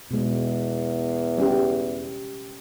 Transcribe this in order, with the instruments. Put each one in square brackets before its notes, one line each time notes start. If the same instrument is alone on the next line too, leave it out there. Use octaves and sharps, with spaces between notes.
[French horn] E2 [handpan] B2 G#3
[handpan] G3 C#4 G4